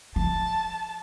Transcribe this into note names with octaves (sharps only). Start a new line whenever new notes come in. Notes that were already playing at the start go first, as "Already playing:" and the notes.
F3 A5